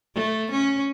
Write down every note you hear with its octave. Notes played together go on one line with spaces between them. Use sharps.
A3
C#4